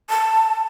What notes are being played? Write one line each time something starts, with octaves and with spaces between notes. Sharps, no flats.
A5